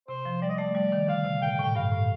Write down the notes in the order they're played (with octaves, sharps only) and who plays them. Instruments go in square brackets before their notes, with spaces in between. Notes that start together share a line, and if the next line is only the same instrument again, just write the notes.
[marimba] C3 [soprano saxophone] C5
[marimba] F3
[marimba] G3 [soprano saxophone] D5
[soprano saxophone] D#5
[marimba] A3 [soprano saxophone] D5
[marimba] G3 [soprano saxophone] D5
[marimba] D#3
[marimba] D3 [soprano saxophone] F5
[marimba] C3
[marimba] A#2 [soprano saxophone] G5
[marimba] A2
[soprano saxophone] G5
[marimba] G2 [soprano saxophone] F5
[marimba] A2